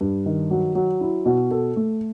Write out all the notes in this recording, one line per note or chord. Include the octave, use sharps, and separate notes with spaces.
G2
D#3
F#3
F#3
E4
B2
A4
A3